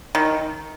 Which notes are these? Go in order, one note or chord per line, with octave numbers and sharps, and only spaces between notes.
D#3